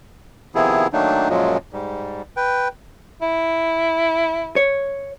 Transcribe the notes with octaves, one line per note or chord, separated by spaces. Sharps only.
C3 D#3 F3 B3 E4 G#4
D#3 F#3 A3 A#3 D4 D#4
F#2 A#2 F3 F#3 G#3
G#2 G3
B4 G5
E4
C#5